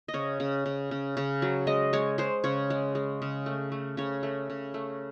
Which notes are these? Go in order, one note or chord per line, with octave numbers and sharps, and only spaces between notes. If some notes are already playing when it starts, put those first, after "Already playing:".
D#5
C#3 C#5
C#3
C#3
C#3
C#3
F#3
G#3 D#5
G#3 C#5
G#3 C5
C#3 C#5
G#3
G#3
C#3
A3
A3
C#3 C#5
A3
C#3
A3